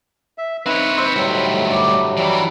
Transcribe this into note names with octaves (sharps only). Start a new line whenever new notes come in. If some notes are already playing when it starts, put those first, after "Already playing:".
E5
C4 D#4 E4 B4 C#5
C5 E5
D2 A2 F#3 G3
G2 D5
E3 F#3 G3